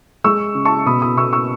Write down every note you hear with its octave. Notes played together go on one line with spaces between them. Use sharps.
G#3 C#6 E6
C#3
A5 C#6
B2 B5 D#6
B5 D#6
B2 C#6 E6
C#6 E6